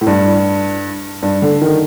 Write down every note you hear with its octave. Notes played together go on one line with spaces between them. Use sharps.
A2
G2
G2
D3
D#3